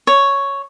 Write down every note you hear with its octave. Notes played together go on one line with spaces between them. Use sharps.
C#5